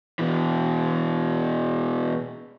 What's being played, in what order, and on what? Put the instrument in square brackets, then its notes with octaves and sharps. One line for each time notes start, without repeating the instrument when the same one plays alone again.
[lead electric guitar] B2 E3